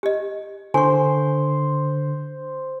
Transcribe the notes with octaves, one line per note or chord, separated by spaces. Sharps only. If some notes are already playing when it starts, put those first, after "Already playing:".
G4 D#5
D3 C5 G#5 C#6